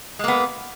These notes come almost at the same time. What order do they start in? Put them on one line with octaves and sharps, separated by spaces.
G#3 A#3 B3